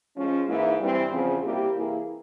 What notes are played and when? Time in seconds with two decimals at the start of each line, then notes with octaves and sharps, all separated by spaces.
0.17 F3 G#3 C#4
0.47 G#2 E3 A#3 E4
0.79 G2 E3 G3 C4
1.11 E2 C#3 F3 C4
1.43 C3 G3 A#3 E4 G4
1.74 C3 E3 A#3 E4 G#4